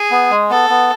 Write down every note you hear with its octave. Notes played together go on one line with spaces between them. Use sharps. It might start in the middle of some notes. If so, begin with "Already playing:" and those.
Already playing: G#4
B3
G#3
B3 A4
B3